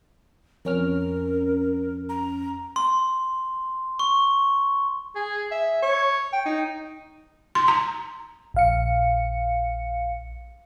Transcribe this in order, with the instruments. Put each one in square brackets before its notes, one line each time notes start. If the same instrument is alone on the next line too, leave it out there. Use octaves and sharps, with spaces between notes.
[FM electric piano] F2 C#4 F6 [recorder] A#4
[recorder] A#5
[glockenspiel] C6
C#6
[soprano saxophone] G#4
E5
C#5
G5
D#4
[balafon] C6
A#5
[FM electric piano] A#1 F5 C#7